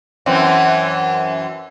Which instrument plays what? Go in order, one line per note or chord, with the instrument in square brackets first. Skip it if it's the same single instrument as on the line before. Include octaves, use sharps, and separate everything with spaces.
[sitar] F#2 E3 C4